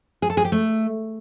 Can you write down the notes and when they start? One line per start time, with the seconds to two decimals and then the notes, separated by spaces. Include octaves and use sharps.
0.22 G#4
0.30 A4
0.37 G#4
0.45 G4
0.52 A3